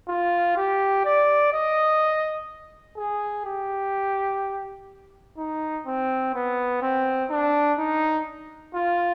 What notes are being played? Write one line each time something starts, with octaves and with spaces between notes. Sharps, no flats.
F4
G4
D5
D#5
G#4
G4
D#4
C4
B3
C4
D4
D#4
F4